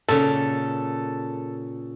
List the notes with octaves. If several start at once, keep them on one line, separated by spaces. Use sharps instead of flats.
A#2 C#3 A4